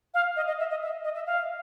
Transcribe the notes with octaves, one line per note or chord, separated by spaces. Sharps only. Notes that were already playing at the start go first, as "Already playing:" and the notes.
F5
D#5
D#5
E5
D#5
E5
D#5
E5
F5